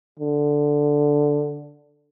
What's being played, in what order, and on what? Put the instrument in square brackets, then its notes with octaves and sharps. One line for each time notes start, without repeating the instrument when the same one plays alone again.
[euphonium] D3